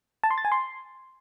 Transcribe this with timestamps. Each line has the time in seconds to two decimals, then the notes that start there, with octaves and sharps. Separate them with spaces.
0.24 A5
0.31 C6
0.38 A6
0.45 G#5
0.52 C6